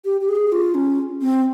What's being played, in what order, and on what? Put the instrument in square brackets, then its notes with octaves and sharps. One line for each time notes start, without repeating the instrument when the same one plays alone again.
[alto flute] G4
G4
G#4
F4
C#4
C4